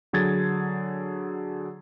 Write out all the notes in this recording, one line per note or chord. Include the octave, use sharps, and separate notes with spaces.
D3 F#3 G#4 G#6 A6